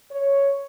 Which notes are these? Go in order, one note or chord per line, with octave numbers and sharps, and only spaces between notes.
C#5